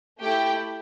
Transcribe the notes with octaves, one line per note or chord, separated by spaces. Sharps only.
A3 E4 G4 A4 G5